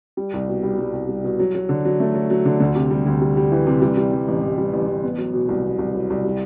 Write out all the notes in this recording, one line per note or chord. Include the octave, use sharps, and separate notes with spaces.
G3
C2
B2
G3
G3
C2
G3
B2
F#3
F#3
D3
F#3
A3
F#3
F#3
D3
D2
C3
G3
D2
G3
G3
E3
C3
G3
G3
G3
A1
A1
G3
A1
A1
B3
F#3
B2
C2
B2
C2
F#3
C2
G3